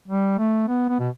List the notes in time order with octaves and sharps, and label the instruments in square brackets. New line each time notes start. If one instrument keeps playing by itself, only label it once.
[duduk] G3
A3
B3
B3
B2